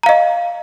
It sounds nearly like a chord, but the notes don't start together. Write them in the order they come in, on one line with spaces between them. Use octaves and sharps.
A#5 F5 D#5